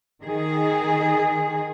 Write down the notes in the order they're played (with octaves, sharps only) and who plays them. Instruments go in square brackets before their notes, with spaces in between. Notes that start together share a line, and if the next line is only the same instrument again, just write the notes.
[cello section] D#3 G#4